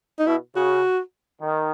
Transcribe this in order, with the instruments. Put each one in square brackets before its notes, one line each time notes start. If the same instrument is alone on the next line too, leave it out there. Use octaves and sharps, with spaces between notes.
[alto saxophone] D#4
[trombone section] B2 [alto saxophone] E4
[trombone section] C#3 [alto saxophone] F#4
[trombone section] D#3